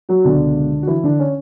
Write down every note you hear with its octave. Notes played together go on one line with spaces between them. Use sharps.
F#3 F#4
C#2 B2 D3 G#3 D4
F#4
E3 E4
D3 D4
C#4